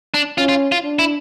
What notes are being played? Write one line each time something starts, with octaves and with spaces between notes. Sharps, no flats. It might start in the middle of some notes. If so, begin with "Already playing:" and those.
D4
C#4 F4
F4
F4
D4
E4